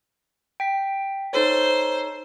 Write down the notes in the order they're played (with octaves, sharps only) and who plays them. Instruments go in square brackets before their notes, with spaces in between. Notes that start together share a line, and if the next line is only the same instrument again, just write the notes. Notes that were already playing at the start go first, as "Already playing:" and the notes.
[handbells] G5 B6
[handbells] D#4 A4 C#5 [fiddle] C5